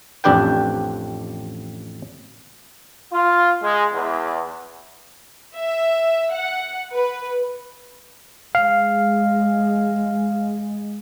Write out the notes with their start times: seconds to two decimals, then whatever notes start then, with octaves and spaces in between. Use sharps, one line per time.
0.24 A1 F2 D4 G4 B4 G5
3.13 F4
3.63 G#3
3.94 E2
5.56 E5
6.32 F#5
6.92 B4
8.55 G#3 F5